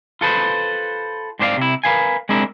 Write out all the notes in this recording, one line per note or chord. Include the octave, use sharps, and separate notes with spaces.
F4 A4 B4 C5
G#2 C4 D4 C5 D5 F5
C3 E4
A#4 B4 F5 G#5
G#3 C4 D4 E4 A#4